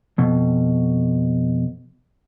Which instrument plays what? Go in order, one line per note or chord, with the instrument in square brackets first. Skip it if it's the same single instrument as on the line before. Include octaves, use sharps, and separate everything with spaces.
[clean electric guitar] F2 B2